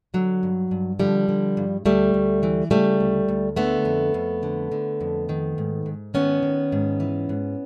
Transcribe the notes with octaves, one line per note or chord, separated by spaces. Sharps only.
D3 F#3
G2
G2
D3 F3 G3
D3
G2
D2 G3 A3
D2
E3
C#3 G3 A3
D2
D2
D3 A3 B3
F2
F2
D3
D3
F2
D#3
G#2
G#2
D#3 B3 C#4
D#3
G#2
E3
G#2